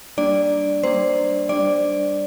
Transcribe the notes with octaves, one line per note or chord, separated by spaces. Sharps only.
G3 A#3 D4 D5
G3 A#3 D4 C5
G3 D4 D5